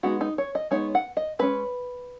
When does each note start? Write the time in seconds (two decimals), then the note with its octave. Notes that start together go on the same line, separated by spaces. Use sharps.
0.03 G#3 B3 D#4 F#4
0.21 D#4
0.38 C#5
0.55 D#5
0.71 G#3 B3 D#4 C#5
0.95 F#5
1.17 D#5
1.39 G#3 C#4 B4